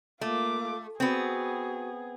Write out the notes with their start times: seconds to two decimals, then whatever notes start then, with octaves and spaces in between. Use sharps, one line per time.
0.21 A3 A#3 F4 D6
1.00 B3 C4 F#4 G#4